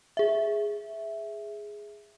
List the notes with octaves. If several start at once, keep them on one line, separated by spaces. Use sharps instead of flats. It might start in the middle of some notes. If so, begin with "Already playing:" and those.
G#4 E5